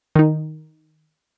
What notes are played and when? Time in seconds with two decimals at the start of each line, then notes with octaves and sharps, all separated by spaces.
0.16 D#3 D#4